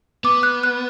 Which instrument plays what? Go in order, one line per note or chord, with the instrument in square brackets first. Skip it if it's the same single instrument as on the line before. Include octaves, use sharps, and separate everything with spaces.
[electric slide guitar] B3 [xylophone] D6
[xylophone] F#6
F#6